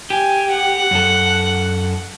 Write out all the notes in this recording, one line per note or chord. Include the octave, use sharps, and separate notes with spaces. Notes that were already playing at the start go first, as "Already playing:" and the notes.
G4 G#5
F#5
F#2 A4